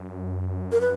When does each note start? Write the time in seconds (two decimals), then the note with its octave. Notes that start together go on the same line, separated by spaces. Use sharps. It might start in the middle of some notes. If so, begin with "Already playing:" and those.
Already playing: F#2
0.72 A#4
0.81 B4